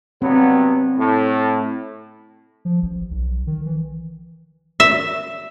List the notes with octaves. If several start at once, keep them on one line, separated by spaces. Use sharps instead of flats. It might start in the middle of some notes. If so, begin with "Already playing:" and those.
G2 F#3 B3 C4
A2
F3
A1
B1
D#3
E3
E5